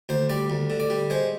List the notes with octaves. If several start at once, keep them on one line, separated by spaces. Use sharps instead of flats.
D2 C5
G3 D5
D2
D3
D5
G3
G#3 C5